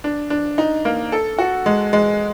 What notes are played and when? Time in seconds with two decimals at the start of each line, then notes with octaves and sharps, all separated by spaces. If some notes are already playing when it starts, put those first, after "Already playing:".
0.04 D4
0.30 D4
0.58 D#4
0.85 A#3
1.12 A4
1.38 F#4
1.66 G#3
1.93 G#3